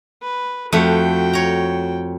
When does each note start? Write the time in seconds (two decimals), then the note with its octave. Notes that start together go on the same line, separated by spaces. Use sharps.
0.22 B4
0.72 F2 A3 F#4 F#5 G5
1.33 C#5 A#5